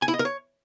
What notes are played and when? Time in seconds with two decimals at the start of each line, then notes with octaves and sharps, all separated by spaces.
0.02 G#5
0.08 E4
0.14 D#5
0.19 A#4
0.25 C#5